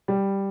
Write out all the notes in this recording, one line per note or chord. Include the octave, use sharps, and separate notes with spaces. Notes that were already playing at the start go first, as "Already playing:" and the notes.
G3